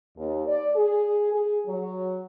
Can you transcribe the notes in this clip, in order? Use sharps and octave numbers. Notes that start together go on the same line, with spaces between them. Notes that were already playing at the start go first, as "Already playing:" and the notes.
D#2
D5
G#4
G#4
F#3